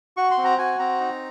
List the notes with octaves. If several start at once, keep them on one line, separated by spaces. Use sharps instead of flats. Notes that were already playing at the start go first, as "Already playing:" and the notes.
F#4 C#6
C6
C4
A#5
F#4 G#5
C4 A#5
D#4